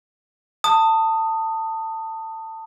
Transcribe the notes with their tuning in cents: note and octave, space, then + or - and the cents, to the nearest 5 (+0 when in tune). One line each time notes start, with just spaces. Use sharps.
A5 +25 D#6 +0